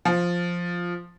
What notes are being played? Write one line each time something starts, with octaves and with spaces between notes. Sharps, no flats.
F3